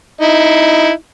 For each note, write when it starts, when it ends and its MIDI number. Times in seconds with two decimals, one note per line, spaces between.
0.21 0.90 63
0.21 0.90 64